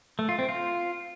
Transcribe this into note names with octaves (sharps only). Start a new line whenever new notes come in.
A3
F4
C4
F4